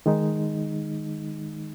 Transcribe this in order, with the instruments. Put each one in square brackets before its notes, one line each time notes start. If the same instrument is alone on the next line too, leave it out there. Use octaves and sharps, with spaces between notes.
[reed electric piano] D#3 G#3 D#4